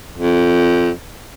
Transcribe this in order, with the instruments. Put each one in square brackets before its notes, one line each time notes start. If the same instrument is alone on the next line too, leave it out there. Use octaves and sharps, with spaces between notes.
[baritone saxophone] F2